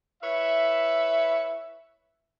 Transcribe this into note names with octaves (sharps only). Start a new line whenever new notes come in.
E4 B4 C#5 E5